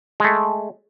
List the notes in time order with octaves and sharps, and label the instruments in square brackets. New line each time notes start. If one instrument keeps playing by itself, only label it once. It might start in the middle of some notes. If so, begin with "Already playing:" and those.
[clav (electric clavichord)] G#3 A3